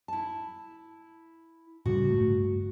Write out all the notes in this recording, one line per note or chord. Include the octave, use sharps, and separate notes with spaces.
E4 A5
A2 C#3 G3 F#4
G1 F2 A3